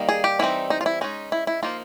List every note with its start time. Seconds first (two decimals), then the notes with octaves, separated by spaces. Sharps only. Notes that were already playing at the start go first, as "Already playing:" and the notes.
Already playing: D#3 G3 A#3 D#4
0.09 G#4
0.24 G4
0.39 E3 G3 C4 D#4 E4
0.70 D#4
0.81 F4
0.86 E4
1.01 G#3 C#4 D#4
1.32 E4
1.47 E4
1.63 F3 A#3 D#4 F4